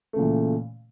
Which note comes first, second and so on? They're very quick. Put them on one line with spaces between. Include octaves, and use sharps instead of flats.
A3 C#3 A#2 E3